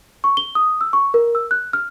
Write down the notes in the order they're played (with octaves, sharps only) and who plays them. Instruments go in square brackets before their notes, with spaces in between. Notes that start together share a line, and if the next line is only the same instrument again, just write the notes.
[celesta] C#6
G7
D#6
E6
C#6
A#4
E6
F#6
F6